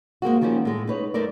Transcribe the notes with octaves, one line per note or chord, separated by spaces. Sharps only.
G#3 A#3 C4 F#4
D#3 F3 G3 A#3 C#4 G4
A2 G#3
D#4 B4 C#5
F#2 A3 D#4 A#4 D5